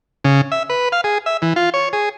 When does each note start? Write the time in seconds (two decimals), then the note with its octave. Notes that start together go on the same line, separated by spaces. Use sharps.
0.24 C#3
0.52 E5
0.70 B4
0.92 F5
1.04 G#4
1.26 E5
1.42 E3
1.56 F4
1.74 C#5
1.93 G#4